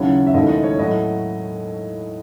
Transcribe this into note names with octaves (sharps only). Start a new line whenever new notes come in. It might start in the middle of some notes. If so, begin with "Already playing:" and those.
Already playing: D#2 C#3 F#3 C#4 E4
E5
E1 D#2 D#3 A3 E4 D#5
D#5
C#5
A2 F#3 A3 E4 D#5